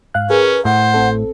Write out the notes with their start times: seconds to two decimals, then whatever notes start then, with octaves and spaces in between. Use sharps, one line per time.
0.14 G#2 F5 F#6
0.30 C#4 G#4 A#4 B4
0.65 A2 C5 F#5
0.94 A1 C4 A4